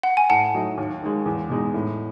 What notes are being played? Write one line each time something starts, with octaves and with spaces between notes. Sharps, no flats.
F#5
G#5
A2 F#5 A5
F#3 A3 D#4
D#2
D#3 G#3
E2
B2 G#3 D#4
A2